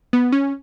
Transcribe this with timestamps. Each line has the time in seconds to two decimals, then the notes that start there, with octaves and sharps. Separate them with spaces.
0.13 B3
0.33 C#4